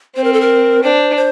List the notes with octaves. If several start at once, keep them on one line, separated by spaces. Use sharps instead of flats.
C4 C5
A#4
A4
A#4
D4 C5
C5